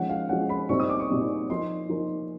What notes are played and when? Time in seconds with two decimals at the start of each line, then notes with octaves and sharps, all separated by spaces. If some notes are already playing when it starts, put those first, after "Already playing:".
Already playing: F3 G#3 C#4 F#5
0.09 F5
0.29 F3 G#3 C#4 F#5
0.49 B5
0.69 A#2 G3 C4 D#4 C#6
0.80 D#6
0.89 D6
1.00 C#6
1.09 A#2 G3 C4 D#4
1.50 F3 A#3 D#4 C6
1.90 F3 A#3 D#4